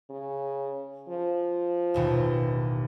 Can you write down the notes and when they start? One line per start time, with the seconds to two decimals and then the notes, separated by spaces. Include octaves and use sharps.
0.10 C#3
1.09 F3
1.94 A1 D#2 B2